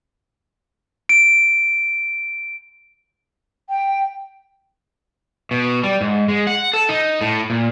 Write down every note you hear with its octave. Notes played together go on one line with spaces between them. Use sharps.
D7
G5
B2
G3
G#2
G#3
F#5
A4
D#4
A2
A#2